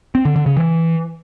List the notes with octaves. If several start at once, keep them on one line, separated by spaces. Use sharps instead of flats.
C4
D3
D3
C#3
E3